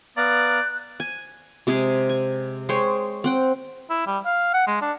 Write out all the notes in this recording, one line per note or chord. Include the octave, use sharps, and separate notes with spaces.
B3 D5 F5 A#5 F#6
G#5
C3 G#3 G#4
G#5
G#3 C5 C#5 G5
C4 F#5 G5
E4
G3
F5
F#5
G#3
D4